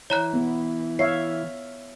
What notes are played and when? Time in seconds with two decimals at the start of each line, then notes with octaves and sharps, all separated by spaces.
0.10 E3 C#5 A#5 F#6
0.33 B3
0.99 C#5 E5 F5 C7